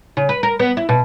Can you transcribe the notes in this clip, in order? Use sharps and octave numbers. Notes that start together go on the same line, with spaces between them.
C#3
B4
A#4
B3
E4
B2